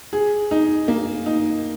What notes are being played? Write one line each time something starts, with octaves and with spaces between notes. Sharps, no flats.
G#4
D#4
A#3
D#4